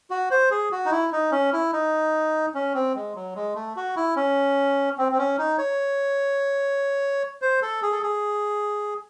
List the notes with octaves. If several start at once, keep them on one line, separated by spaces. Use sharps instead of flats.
F#4
C5
G#4
F#4
D#4
E4
D#4
C#4
E4
D#4
C#4
C4
G#3
F#3
G#3
A3
F#4
E4
C#4
C4
C4
C#4
D#4
C#5
C5
A4
G#4
A4
G#4